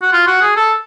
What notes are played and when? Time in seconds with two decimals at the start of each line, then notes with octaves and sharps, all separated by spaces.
0.02 F#4
0.12 F4
0.27 F#4
0.42 G#4
0.57 A4